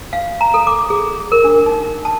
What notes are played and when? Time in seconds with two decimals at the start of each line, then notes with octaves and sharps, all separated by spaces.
0.13 F5
0.41 A#5
0.54 A4
0.67 D6
0.90 G#4
1.32 A#4
1.44 D4
1.66 D#4
2.05 A5